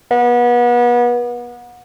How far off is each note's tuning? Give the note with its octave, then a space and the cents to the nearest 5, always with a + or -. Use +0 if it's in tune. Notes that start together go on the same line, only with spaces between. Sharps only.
B3 -30